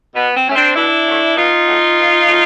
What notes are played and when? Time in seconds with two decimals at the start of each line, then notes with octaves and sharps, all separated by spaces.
0.14 B2 B3
0.35 C4
0.46 F#3 A3 C#4
0.55 C4 D4
0.75 B2 D4 E4
1.06 F#3 A3
1.35 B2 D#4 F4
1.66 F#3 A3
1.96 B2
2.26 F#3 A3